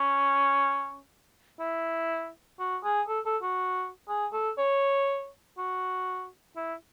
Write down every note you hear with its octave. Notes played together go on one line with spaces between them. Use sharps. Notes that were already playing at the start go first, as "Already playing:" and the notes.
Already playing: C#4
E4
F#4
G#4
A4
A4
F#4
G#4
A4
C#5
F#4
E4